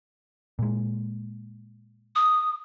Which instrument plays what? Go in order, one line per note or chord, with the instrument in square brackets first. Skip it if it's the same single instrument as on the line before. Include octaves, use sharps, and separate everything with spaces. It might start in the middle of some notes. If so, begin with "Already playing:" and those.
[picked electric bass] A#2 G#3
[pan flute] D#6